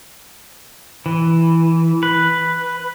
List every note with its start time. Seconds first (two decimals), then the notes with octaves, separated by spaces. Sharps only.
1.06 E3
2.03 B4